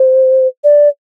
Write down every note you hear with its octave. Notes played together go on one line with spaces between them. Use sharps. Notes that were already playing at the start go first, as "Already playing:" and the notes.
Already playing: C5
D5